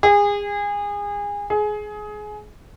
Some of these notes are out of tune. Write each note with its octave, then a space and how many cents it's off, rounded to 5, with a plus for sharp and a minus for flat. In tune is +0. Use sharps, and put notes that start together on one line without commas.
G#4 -30
G#4 +20